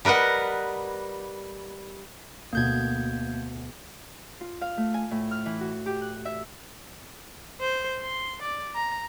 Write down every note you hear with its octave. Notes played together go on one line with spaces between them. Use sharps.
G3 A#4 B4 D#5 F#5
D2 B2 A#3 G6 G#6
F4
F5
A3
G#5
A2
F6
E3
F#4
G4
F#6
E5
C5
C6
D5
A#5